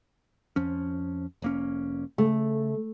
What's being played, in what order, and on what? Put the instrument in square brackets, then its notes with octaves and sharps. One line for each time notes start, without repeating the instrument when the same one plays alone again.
[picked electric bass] F2 F3 C#4
F1 A#3 C#4
[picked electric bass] C#3 [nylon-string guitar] A3